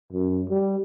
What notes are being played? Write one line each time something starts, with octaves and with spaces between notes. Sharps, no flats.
F#2
G3